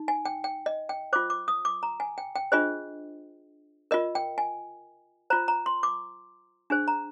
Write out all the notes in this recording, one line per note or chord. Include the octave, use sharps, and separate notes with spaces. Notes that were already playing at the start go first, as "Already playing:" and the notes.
Already playing: D#4
G#5
G5
G5
D#5
G5
F4 C5 D6
D6
D#6
D6
A#5
G#5
G5
G5
D4 F4 G#4 C5 D#5
F4 A#4 D#5
G5
G#5
F4 C5 A#5
A#5
C6
D6
D4 G#4 C5
A#5